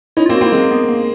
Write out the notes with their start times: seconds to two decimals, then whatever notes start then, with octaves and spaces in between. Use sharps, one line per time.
0.17 C#4 D#4 E4
0.26 F4
0.29 A#3 C4
0.35 F#4
0.41 A#3 C4
0.44 E4
0.52 G#3 A#3 C4
0.71 B3
0.89 A#3